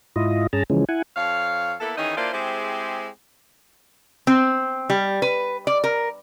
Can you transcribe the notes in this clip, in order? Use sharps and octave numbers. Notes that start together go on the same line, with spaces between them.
G#2 E4 F4 D#5
G2 C#4 G#4 A5 A#5
C#3 E3 F3 G#3 C#4
E4 F#5 G#5
F2 A4 C#5 F5
A#3 B3 E4 A4
D#3 E3 C#4 D#4 G#4 D#5
A#3 D4 E4 F4 C5 D5
G#3 C4 E4 G4 G#4 C5
C4
G3
B4
D5
A#4